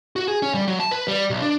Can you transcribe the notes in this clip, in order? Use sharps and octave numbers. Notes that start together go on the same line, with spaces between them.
F#4
G#4
C#4
G3
F#3
A5
B4
G3
B1
D4